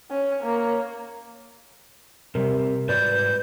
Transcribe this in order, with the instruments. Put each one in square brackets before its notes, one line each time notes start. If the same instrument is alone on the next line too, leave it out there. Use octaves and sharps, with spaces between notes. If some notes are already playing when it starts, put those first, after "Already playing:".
[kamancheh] C#4
A#3 C#5
[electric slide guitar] C3 [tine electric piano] G3 A#4
[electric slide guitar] G#2 F#4 D5 [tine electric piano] B4 [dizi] G6